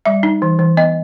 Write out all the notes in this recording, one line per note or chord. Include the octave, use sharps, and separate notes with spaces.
G3 E5
D#4
E3
E3
B3 D#5